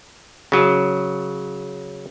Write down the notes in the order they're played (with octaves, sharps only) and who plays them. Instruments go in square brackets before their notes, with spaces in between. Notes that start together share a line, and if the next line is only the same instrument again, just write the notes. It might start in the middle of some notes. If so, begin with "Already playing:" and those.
[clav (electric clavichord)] C#3 F#3